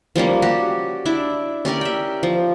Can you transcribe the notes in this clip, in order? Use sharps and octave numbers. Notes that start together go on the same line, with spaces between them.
F3 G3 A#3 C#4
F#4 G4 A5
D4 E4 E5 D6
C#4 G4 A#4 D5
E5 G5
F3